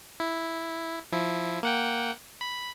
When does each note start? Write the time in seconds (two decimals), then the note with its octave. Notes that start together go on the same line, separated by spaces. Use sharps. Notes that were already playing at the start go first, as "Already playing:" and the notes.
0.20 E4
1.12 F3 E4
1.63 A#3 F#5 G5
2.41 B5